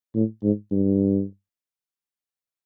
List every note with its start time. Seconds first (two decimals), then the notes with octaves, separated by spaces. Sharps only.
0.15 A2
0.43 G#2
0.71 G2